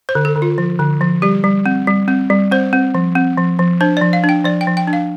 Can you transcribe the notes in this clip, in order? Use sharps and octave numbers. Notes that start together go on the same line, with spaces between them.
C5
D3
A4
D3
F4
F3
D3
F3
G3 G4
G3
C4
G3
C4
G3
C4 C5
C4
F3
C4
F3
F3
D4 C5
D5
F3
F5
D4
G5
F3 D5
G5
F3
G5
D4
F5